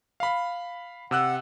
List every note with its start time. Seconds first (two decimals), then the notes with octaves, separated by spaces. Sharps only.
0.20 F5 B5
1.11 C3 F#5 E6 F#6